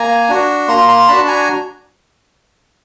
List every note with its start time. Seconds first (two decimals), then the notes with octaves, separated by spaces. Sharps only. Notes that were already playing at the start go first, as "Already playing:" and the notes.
Already playing: A#3 G#5 A#5
0.29 D4 F#4
0.68 A#3 A#5 C6
0.89 A#5 C6
1.08 D4 F#4 A5 B5
1.28 G#5 A#5